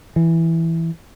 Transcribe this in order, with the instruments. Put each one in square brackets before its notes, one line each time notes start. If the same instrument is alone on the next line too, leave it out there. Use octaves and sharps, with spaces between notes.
[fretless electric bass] E3